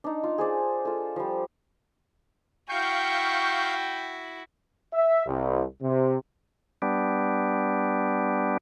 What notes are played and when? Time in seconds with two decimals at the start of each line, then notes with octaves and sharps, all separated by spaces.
0.04 D4 D#4
0.24 F4
0.38 G#4 C5 D5
0.85 F4 A4
1.16 F3 G3
2.69 E4 F#4 F5 G5 C#6 G6
4.94 E5
5.27 C2
5.82 C3
6.82 G3 B3 D4